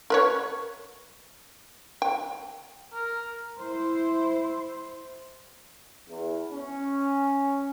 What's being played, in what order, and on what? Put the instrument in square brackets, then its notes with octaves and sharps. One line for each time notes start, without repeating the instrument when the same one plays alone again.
[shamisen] A#4 B4 C#5
G5
[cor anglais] A#4
[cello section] E4 C5
[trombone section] E2
C#4